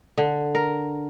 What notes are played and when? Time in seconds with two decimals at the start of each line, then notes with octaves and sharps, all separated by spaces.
0.18 D3
0.55 A#4